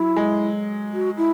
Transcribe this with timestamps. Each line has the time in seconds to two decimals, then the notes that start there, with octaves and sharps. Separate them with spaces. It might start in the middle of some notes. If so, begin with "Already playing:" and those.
Already playing: F#3 E4
0.16 G#3
0.92 F#4
1.17 E4